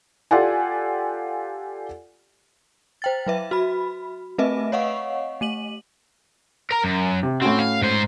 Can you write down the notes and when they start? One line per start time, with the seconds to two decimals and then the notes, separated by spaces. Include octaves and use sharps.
0.31 F4 G4 A4 D5 F#5 G#5
3.02 C5 G5 A6
3.26 F#3 B4 E5
3.51 F#4 B5
4.38 A3 C4 B4 D#5 E5
4.72 C#5 D#5 F5 F#5 C#6
5.41 A3 D#7 F#7
6.71 A#4 A#5
6.84 F#2
7.23 C3
7.42 A2 C4 C#4 F#4
7.59 F5
7.82 G#2 C5